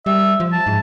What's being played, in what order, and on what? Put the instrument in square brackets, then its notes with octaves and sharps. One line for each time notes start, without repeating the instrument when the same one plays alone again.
[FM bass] G3 [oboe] E5
[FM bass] F3
[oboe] A5
[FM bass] G#2